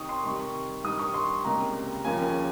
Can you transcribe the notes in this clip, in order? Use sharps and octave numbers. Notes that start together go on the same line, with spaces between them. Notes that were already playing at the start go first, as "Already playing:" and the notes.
Already playing: C3 D#3 G5 C#6 D#6
C6
C3 D#3 G3 C#6
G2 D#3 G3 D#6
C#6
C6
C#2 C3 G3 A#3 A#5
D#2 C#3 F3 A#3 C#4 G#5